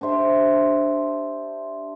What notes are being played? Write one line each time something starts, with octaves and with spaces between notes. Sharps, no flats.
D4 G4 C5 E5